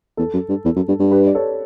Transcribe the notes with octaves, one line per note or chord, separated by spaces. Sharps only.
E2 A4
F#2
G2
E2
F#2
G2
G2
G4 B4
D5
A4 C#5